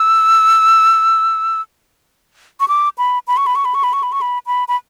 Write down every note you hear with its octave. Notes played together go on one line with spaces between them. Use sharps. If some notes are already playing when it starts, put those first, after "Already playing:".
Already playing: E6
C#6
D6
B5
B5
C#6
B5
C#6
B5
C#6
B5
C#6
B5
C#6
B5
B5
B5